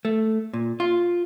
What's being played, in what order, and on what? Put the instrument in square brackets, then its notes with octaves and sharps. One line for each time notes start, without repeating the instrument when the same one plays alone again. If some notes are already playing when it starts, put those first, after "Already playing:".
[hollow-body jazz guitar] A3
A#2
F4